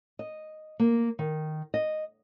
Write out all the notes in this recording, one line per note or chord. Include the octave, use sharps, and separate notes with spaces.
D#5
A#3
D#3
D#5